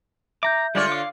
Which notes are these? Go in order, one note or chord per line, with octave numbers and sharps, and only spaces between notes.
E5 A#5 D6 G6
D3 G3 G#3 F4 C#5 D5
F5 D6